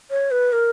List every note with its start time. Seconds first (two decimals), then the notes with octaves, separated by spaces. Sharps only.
0.11 C#5
0.31 B4
0.53 A#4